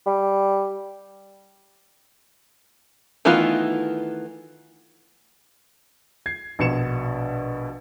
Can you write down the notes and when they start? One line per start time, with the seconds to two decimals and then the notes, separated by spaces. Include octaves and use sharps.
0.06 G3
3.25 D#3 E3 A3 B3 F4
6.26 G#6 C7
6.59 A#1 B2 C#7 E7